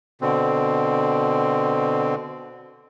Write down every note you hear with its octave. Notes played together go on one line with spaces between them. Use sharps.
B2 D3 C4